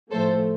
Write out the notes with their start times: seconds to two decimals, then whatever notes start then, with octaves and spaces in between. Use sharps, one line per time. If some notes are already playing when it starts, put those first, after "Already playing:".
0.11 A2 F3 A3 A4 C5